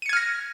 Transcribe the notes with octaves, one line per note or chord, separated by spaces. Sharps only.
F6 G#6 A#6 C#7 D#7